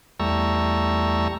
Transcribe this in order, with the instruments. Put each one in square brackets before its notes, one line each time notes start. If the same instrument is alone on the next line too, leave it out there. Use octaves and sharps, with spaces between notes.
[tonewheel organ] E2 G3 A3 A#5 C#6 E6